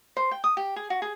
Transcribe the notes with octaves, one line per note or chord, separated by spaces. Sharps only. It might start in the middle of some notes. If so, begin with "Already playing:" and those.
C5
G5
D#6
G4
G#4
F#4
G#4